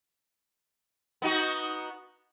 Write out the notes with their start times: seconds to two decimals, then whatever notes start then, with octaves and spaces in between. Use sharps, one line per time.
1.22 B3 D#4 F#4